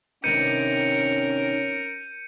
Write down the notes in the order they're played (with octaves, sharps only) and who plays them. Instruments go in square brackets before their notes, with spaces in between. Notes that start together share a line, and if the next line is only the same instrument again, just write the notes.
[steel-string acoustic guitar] G2 C3 D#3 [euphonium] C#4 [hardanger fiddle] A#4 [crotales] G6 C#7 D#7